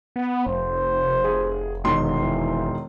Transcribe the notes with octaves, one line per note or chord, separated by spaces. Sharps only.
B3
F1 C5
G#4
E1 D#3 C6
E3